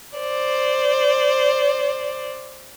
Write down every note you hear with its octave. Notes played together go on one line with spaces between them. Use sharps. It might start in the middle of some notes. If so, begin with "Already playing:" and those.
C5 D5